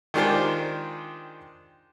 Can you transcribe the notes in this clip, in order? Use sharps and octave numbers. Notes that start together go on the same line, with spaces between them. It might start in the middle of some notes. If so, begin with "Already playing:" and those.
D#3 G#3 D4 F4 G4 C5